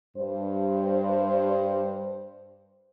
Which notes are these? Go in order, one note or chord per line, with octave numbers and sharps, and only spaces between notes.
G2 C5